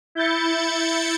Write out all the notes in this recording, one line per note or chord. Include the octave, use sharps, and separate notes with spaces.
E4 G6 A6 C#7